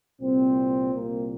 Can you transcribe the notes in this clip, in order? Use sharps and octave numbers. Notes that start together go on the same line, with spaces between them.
C2 A#2 C4
C2 A#2 A#3